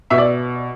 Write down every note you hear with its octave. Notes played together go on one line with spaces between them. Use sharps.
B2 E5
D5